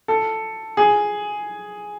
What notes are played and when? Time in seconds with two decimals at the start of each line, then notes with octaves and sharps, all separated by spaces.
0.08 A4
0.77 G#4